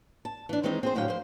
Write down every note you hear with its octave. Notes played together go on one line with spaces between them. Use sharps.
A5
E3 D4
D#3 E3 G#3 C4 D#4
C4 G#4 C5
A2 D3 F#3 F5 G5
F3 C5